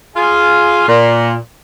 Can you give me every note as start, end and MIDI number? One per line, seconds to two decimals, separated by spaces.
0.15 0.83 65
0.15 0.83 68
0.15 0.83 77
0.87 1.34 46